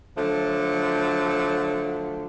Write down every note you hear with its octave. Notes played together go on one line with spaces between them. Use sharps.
D3 F3 F#3 A3